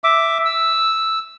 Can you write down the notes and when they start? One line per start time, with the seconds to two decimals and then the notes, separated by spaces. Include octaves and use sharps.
0.04 E5 D6
0.46 E6